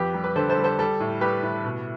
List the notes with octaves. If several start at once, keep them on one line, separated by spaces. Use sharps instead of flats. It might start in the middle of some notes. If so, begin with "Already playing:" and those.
Already playing: F2 G4 B4
G3
B4
D3 A4 C5
A4 C5
G3
A4 C5
G3 A4
A2
G3 G4 B4
A2
B2